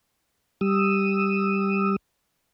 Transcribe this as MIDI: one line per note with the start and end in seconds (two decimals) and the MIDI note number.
0.61 1.96 55
0.61 1.96 87
0.61 1.96 88